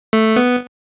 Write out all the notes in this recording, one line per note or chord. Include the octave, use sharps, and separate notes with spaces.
A3
B3